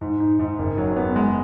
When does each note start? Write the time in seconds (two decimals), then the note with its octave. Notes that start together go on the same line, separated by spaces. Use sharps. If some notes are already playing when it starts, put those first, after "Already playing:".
0.01 G#2
0.20 D#4
0.39 G#2
0.59 F#1
0.78 F#3
0.96 B3
1.16 G#3